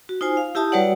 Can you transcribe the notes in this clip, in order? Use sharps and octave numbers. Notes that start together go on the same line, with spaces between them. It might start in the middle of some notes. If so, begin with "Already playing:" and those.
F#4
D#4 F4 C5 G#5
F5
E4 G4 E5 A5 D#6
G3 F#4 B4 C#5 D5 F#5